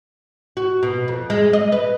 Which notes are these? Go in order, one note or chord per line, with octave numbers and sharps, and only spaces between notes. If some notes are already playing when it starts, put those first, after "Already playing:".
F#4
B2
F2
G#3
D#5
B4